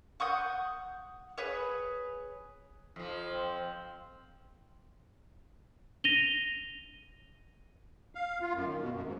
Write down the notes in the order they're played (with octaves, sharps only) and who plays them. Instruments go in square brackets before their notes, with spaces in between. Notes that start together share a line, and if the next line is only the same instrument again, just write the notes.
[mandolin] F#5 C#6 D#6 G6
G#4 B4 C#5
[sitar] F2 F3
[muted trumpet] C4
[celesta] A#6 D#7 F7 G7
[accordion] F5
F4
F#2
D#3
B2
F#2
G#2